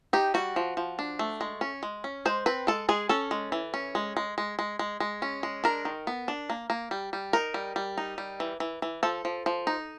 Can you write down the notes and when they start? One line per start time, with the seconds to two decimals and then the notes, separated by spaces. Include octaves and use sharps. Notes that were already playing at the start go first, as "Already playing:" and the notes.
0.13 D#4 G4
0.34 G3 F#4
0.56 F3
0.77 F3
0.99 D4
1.19 A3
1.41 G#3
1.61 C#4
1.83 G#3
2.04 C#4
2.25 G#3 C5
2.46 C4 B4
2.67 G#3 A4
2.89 G#3 G#4
3.09 C#4 A4
3.31 G#3
3.52 E3
3.74 C#4
3.95 G#3
4.17 G#3
4.38 G#3
4.59 G#3
4.79 G#3
5.00 G#3
5.22 C#4
5.43 G#3
5.64 D4 A#4
5.85 D#3
6.07 B3
6.28 D4
6.50 A#3
6.70 A#3
6.91 G3
7.13 G3
7.33 D#4 A#4
7.54 G3
7.76 G3
7.98 D#4
8.18 G3
8.40 E3
8.60 E3
8.82 E3
9.03 F3 A4
9.25 F3
9.46 F3
9.67 D#4